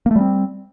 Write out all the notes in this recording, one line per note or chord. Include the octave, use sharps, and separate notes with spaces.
G3 A3 A#3 C4